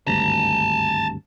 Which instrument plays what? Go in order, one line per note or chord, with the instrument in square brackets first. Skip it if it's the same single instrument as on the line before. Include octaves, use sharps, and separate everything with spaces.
[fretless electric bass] G#1 D2 G2 [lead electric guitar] A5 A#5